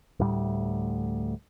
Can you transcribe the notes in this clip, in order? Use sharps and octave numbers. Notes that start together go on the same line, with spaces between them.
D2 A2 G3